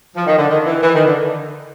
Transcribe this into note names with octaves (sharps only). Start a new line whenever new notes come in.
F3
D#3
D3
D#3
E3
E3
D#3
D3